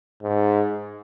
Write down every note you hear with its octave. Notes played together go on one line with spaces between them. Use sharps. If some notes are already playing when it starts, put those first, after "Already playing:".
G#2